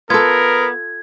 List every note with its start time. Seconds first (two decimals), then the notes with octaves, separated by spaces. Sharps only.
0.10 B3 F4 A4 A#4 G#6